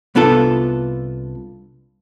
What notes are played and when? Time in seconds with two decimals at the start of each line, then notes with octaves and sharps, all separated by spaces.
0.15 C2 B3 D4 F4 A4